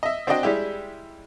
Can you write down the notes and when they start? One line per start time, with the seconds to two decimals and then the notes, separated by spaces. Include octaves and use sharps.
0.03 D#5 E5
0.27 C4 D4 F#4 D5 D#5 G5
0.43 G3 G#3 E4 G4